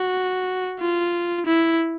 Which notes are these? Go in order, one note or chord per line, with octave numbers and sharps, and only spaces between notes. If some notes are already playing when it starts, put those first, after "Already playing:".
Already playing: F#4
F4
E4